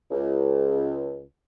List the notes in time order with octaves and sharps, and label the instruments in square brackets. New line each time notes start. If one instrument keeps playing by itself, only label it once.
[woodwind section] C#2